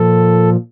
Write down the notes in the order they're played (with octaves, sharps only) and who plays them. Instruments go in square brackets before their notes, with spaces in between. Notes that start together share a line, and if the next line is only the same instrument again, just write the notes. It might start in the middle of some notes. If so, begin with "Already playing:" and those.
Already playing: [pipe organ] A#2 F3 A4